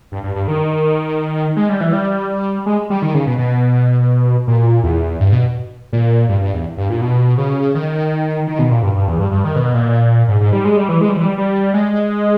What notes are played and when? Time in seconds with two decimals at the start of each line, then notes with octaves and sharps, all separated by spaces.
0.12 G2
0.24 G2
0.36 G2
0.48 D#3
1.56 G#3
1.69 G3
1.81 E3
1.93 G3
2.66 G#3
2.90 G3
3.02 D#3
3.14 C#3
3.27 B2
3.38 B2
4.47 A#2
4.84 E2
5.20 G2
5.32 B2
5.93 A#2
6.29 G2
6.41 G2
6.53 E2
6.77 G2
6.90 A#2
7.01 B2
7.38 C#3
7.75 D#3
8.47 D#3
8.59 B2
8.71 A#2
8.83 G2
8.95 G2
9.07 E2
9.19 G2
9.31 G2
9.44 D#3
9.56 B2
9.74 A#2
10.28 G#2
10.41 G#2
10.53 G3
10.65 G#3
10.77 G3
10.89 E3
11.01 G#3
11.09 G3
11.17 E3
11.24 G3
11.38 G3
11.74 G#3